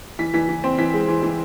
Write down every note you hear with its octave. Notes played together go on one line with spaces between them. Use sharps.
E3 B6
E3 B6
E3
C4
E3 B6
G#3
E3
E3